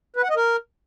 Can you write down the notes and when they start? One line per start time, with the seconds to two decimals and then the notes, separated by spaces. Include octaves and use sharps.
0.16 B4
0.23 F#5
0.30 D#5
0.37 A#4